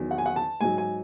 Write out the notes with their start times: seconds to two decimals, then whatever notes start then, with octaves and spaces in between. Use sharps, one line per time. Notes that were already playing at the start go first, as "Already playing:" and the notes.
Already playing: E2 D#3 F#3
0.11 F#5
0.18 G#5
0.26 F#5
0.36 A5
0.61 G#2 F#3 G#5
0.78 G#5